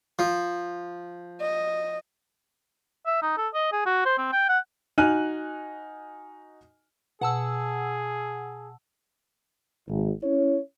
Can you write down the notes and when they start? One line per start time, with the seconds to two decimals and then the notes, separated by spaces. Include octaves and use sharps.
0.19 F3
1.41 D#5
3.06 E5
3.22 D#4
3.37 A4
3.54 D#5
3.72 G#4
3.86 F#4
4.05 C5
4.18 C4
4.32 G5
4.49 F#5
4.98 D#4 F#4 G#5 F6 F#6 D#7
7.21 B2 G#4 F#5 A5 E6
9.89 G#1
10.23 C#4 E4 C#5